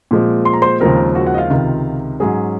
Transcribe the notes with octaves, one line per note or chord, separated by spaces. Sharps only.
A#2 F3 G#3 C4
C6
A#5
C5 C6
D#2 C#3 F3 G#3 C4 A#4 A#5
F#4 F#5
F#4 F#5
D#5
F4 F5
C#2 C3 D#3
G#2 F#3 C#4 G#4